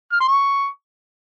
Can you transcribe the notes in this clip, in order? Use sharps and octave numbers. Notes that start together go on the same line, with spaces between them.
F6
C6
C#6